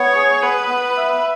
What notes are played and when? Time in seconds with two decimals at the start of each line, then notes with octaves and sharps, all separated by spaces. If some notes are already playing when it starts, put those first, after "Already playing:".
Already playing: B3 C#5
0.15 G#4
0.42 B3 B4
0.69 B3
0.97 E5